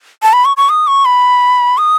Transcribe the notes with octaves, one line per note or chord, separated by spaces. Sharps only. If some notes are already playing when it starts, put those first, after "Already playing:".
A5
B5
C#6
C#6
D#6
C#6
B5
D#6